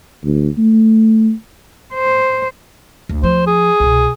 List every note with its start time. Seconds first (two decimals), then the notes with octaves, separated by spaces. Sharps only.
0.24 D2
0.58 A3
1.94 C5
3.09 D2
3.23 F3 C5
3.47 G#4
3.80 C2 B2